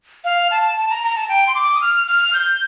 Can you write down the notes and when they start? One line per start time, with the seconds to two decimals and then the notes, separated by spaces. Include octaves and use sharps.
0.24 F5
0.51 A5
0.77 A5
0.90 A#5
1.03 A#5
1.16 A5
1.29 G5
1.47 C6
1.55 D6
1.74 D#6
1.82 F6
2.07 F6
2.34 G6